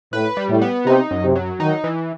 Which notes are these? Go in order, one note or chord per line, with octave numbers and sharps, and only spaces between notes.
A2 B4
G3
A2
B3
C3 D#4
F#2
C3
F#3
D#3 D#4
E3